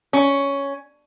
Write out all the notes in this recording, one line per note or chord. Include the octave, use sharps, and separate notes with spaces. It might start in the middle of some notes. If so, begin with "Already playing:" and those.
C#4